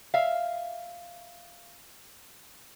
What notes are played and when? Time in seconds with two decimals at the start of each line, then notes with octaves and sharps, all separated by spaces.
0.14 E5 F5